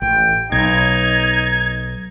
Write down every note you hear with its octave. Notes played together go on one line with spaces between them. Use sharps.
A1 G5
B1 D#4 G#6